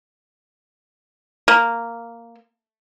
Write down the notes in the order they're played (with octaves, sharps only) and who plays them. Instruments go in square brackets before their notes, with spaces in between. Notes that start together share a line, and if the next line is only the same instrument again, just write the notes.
[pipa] A#3